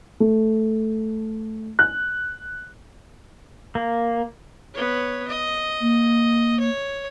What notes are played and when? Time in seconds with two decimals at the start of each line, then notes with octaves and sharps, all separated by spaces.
0.20 A3
1.79 F#6
3.75 A#3
4.74 B3 C#5
5.27 D#5
5.81 A#3
6.60 C#5